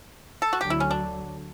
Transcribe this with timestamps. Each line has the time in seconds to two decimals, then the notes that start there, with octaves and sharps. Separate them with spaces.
0.42 A4
0.53 F#4
0.61 D2 D3 F#3 G4
0.70 E4
0.80 C#4
0.91 D4